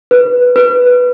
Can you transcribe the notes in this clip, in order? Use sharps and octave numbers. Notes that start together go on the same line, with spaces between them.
B4
B4